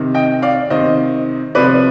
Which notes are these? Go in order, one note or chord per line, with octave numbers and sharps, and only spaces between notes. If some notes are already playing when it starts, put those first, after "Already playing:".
Already playing: C3 D#3
D#5 G5
D5 F5
C3 D#3 C5 D#5
C3 F3 B4 D5